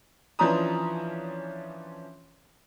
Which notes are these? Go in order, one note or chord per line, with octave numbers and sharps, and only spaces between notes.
E3 F3 C#4 D4 A#5 D#6